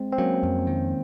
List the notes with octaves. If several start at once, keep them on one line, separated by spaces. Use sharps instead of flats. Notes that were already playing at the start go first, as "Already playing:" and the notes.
Already playing: G#3 C4
C4
F#3 A#3 C#4
F2
D#3